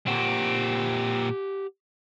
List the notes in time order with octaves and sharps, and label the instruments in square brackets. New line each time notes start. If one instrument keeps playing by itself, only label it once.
[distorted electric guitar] A#2 C4 [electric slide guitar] G4 F#5